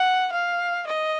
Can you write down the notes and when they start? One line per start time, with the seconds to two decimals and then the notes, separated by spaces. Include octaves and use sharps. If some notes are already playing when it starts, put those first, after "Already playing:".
Already playing: F#5
0.32 F5
0.87 D#5